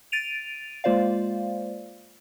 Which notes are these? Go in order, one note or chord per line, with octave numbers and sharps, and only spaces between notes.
A6 D7 D#7 F7
G#3 A#3 F4 C5 D5 F5